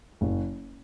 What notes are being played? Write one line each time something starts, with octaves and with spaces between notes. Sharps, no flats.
F#1